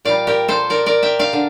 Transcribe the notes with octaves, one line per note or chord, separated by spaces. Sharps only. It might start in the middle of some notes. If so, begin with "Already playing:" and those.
A#2 G3 D5 F5
G4 A#4
A4 C5
A#4 D5
A#4 D5
E5 G5
D5 F5
D3